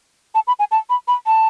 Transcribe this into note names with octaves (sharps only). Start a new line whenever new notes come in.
A5
B5
G#5
A5
B5
B5
A5